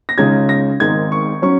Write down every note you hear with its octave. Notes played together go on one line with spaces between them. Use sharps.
A#6
C#2 C#3 G#3 D#4 G#6
A#6
G#1 G#2 D#3 G#3 G#6
C#6
F#3 C#4 C#6